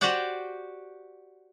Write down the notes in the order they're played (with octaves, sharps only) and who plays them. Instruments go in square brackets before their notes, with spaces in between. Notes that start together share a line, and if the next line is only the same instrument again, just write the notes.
[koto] F#4 G4 C5 D5 F#5 G5